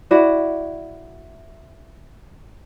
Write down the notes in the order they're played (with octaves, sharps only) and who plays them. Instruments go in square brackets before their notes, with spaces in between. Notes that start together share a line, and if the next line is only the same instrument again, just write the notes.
[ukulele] E4 F#4 D5